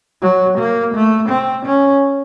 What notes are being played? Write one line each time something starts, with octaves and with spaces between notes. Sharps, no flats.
F#3
A#3
A3
C4
C#4